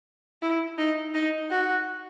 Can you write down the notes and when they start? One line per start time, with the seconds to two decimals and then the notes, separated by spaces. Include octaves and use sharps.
0.42 E4
0.78 D#4
1.14 D#4
1.50 F#4